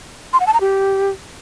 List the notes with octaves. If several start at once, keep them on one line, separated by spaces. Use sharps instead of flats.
C6
F#5
A5
A#5
G4